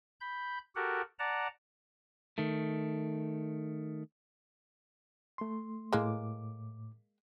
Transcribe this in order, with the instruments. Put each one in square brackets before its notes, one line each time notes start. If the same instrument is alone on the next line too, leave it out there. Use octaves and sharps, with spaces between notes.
[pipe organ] B5 G6
F#4 G4 A4 A#4 F#5
D5 F#5 A5 A#5
[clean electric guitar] D#3 A3
[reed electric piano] A3 C6
[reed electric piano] A2 D6 [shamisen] G#3 A#3